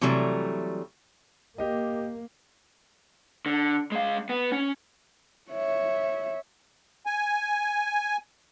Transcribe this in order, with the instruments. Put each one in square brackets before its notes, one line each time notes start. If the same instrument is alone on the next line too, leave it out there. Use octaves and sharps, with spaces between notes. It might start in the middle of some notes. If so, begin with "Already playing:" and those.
[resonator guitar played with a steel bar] C3 E3 F#3 G3 A3
[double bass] A#3 [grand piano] G4 D#5
[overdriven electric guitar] D3
G#3 F5
B3
C#4
[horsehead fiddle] C#5 E5
[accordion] G#5